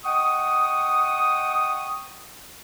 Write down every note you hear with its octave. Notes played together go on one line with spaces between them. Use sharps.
D#5 F#5 G5 C#6 D#6